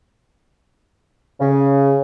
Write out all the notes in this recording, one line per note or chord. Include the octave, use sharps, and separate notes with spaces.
C#3